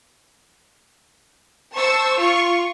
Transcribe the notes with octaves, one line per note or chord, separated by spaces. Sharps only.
C5 A5 C#6 E6
F4 C#6